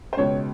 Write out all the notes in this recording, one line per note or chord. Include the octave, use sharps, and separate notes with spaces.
C5
C#2 B2 G#3 C#5